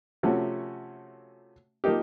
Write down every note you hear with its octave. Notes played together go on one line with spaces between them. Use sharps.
C3 F3 A3 C#4 F#4
F3 A#3 D#4 G4